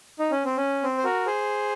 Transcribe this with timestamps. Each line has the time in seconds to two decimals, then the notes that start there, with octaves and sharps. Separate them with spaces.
0.19 D#4
0.31 C#4
0.45 C4
0.57 C#4
0.83 C4
0.98 C5
1.04 F#4 A#4
1.26 G#4 C5